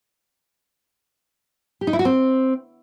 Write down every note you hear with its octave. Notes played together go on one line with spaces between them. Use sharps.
G4
D#4
E4
F#4
C4